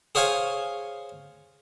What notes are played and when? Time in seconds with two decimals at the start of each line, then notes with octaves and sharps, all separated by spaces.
0.15 G#4 C5 C#5 F5 G#5